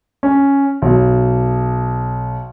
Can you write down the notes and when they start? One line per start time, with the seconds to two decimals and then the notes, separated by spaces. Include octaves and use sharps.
0.23 C#4
0.82 B1